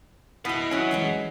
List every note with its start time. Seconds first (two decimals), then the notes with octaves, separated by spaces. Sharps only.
0.45 B2 E4 B4 D#5 E5
0.71 F#3 C#4
0.91 E3 G#3 D#4